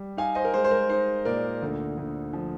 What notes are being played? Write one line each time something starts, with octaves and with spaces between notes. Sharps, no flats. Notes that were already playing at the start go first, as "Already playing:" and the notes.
Already playing: G3
D#4 F5 G#5
C5 D#5
A#4
G#3 C5
C5
A#4
D#4 C5
A#2 A#4 D5
D2
D2
F3